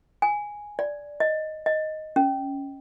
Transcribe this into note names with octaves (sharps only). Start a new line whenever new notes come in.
G#5
D5
D#5
D#5
C#4